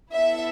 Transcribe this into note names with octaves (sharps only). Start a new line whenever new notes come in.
B3 E4 A4 E5